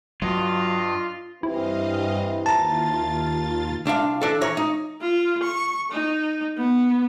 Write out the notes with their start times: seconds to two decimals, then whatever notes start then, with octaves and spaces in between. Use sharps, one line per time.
0.22 G2 F#3 F4 D#5
1.43 G2 E3 C4 E4 G4 D#5 F5
2.46 D#2 F4 A5 A#5 A6
3.86 C2 D4 F4 F5
4.22 E3 D4 A4
4.41 E3 C#5 A#5
4.57 D#4
5.01 F4
5.42 C#6
5.92 D#4
6.57 B3